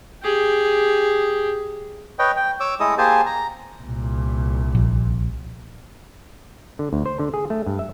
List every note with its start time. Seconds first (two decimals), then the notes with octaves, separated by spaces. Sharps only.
0.23 G4 G#4
2.19 B4 C#5 D#5 G5
2.36 G5
2.60 C#5 D6 E6
2.80 G#3 A3 E4 A4 D#5 D#6
2.98 A#3 G4 G#4 C5 G#5 A5
3.26 A#5
3.82 C2 A#2
4.75 A#1
6.79 D3
6.93 D2
7.06 C5
7.20 D3
7.34 G#4
7.50 A3
7.67 G2
7.79 E5